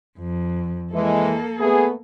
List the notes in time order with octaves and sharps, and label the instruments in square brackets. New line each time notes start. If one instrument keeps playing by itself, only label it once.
[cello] F2
[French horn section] E3 G#3 [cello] A#3 A4
[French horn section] A3 B3 [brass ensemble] G#4